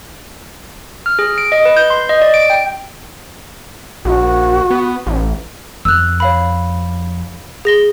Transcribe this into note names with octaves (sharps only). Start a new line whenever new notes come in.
F6
G#4
D7
D#5
B4
G6
C6
D#5
D5
D7
G5
A#1 F#4
B3
A1
F2 E6 F#6
C#5 F5 B5
G#4 A#6 G7